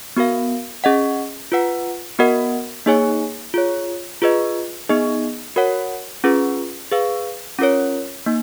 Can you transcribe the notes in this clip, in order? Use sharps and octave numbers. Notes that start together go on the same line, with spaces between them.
B3 F#4 A#4 F5
C#4 G#4 D#5 F#5
F4 B4 F#5
B3 F#4 A#4 D#5 F#5
A#3 D#4 G#4 C#5 G#5
F4 G#4 C#5
F4 G#4 B4 D#5
B3 D#4 G#4 D#5
F#4 A#4 C#5 F#5
C#4 F4 G#4 B4
G#4 B4 F5
C#4 F4 A#4 C#5
A#3 D#4